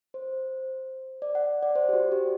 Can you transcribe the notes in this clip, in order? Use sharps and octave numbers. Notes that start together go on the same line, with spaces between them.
C5
D5
F#5
D5
C5
G4
F#4
G4